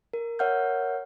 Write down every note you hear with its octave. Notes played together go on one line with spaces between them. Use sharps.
A#4
A#4 C#5 E5 F#5 F6 G6